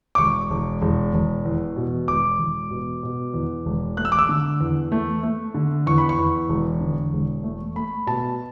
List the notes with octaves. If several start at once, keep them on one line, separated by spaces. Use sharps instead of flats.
D6
E1 C#6
E1
E1
E1
E2
B2
E1 D6
E1
B2
B2
E2
E1
A3 F#6
E6
D6
E6
D3
E2
A3
A3
D3
E2 C#6
B5
C#6
E2
E1
D3
E1
A3
A3 B5
B2 A5